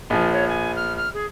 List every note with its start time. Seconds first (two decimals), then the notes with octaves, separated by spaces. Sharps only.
0.10 A#1 F3 G#5
0.31 C#5
0.48 G#5
0.76 F6
0.96 F6
1.13 G#4